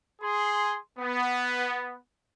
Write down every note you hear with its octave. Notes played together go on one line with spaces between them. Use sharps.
G#4 C6
B3